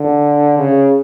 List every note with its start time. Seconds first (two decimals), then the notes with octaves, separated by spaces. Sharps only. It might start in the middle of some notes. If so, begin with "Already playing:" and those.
Already playing: D3
0.58 C#3